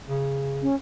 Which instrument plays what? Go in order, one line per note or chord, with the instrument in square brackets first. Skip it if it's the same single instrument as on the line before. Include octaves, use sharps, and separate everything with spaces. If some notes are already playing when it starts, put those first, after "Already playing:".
[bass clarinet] C#3
[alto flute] C#4